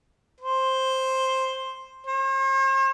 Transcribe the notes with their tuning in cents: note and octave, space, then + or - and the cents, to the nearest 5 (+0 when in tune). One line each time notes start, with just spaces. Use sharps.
C5 +5
C5 +45